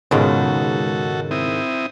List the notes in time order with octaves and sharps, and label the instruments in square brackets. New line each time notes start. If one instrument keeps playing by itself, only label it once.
[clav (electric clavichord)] C#2 B2 [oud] G#2 D#3 [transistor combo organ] F#4 A4
[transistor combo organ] C4 E4 D#6